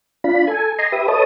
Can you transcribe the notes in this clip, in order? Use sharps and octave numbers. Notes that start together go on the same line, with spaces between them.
D4 F4 B5
A4 G#5
D#5 G#5 A#5 C6
G4 B4 E5 D#6
A4 B4 C#5 D#5 A5 D#6